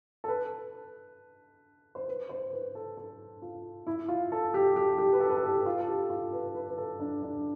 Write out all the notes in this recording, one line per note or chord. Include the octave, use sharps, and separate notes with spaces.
A4
B4
C5
B4
C5
B4
A4
A4
F4
E4
F4
A4
G4
G4
G4
B4
A4
B4
A4
G4
F4
A4
G4
F4
B4
B4
B4
A4
D4
D4